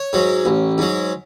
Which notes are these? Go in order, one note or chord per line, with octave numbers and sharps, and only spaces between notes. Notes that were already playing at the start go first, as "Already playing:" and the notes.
Already playing: C#5
G#2 F#3
A1
G#2 F#3